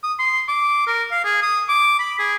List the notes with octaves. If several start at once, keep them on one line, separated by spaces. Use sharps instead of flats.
D#6
C6
D6
A#4
F5
G#4
D#6
D6
B5
G#4